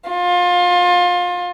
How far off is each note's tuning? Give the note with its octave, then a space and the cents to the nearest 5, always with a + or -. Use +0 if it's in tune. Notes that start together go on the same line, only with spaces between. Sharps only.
F4 +25